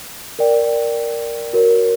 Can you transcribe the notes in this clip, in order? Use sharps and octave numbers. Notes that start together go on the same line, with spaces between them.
A#4 D5 G5
F#4 A#4 C#5